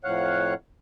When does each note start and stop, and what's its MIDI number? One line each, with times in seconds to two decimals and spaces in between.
0.04 0.54 41
0.04 0.54 45
0.04 0.54 73
0.04 0.54 77
0.04 0.54 78
0.04 0.54 90